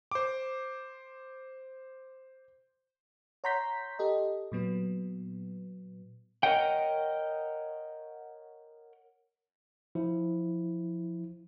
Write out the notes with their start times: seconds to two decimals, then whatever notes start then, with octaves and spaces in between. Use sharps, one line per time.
0.11 C5 D6
3.44 C#5 F#5 A#5 C6 G6 B6
3.99 G4 A4 D#5
4.52 A#2 F#3 B3
6.43 A#4 C#5 D#5 F#5 G5
9.95 F3 E4